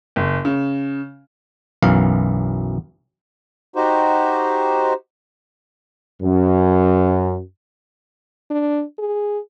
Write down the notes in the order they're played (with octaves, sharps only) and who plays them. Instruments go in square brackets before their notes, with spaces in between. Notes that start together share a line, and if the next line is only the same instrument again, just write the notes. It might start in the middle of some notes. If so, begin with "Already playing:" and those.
[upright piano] F#1
C#3
[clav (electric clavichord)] B1 F#2 E3 F5
[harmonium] D#4 F#4 G4 C5
[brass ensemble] F#2
[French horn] D4
G#4